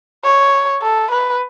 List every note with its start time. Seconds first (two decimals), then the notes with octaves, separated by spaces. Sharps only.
0.24 C#5
0.82 A4
1.11 B4